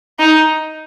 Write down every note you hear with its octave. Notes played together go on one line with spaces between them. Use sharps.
D#4